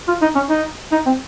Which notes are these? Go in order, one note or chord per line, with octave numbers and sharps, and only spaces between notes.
F4
D#4
C#4
D#4
D#4
C4